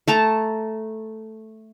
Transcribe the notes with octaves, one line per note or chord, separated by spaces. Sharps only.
A3 A5 A#5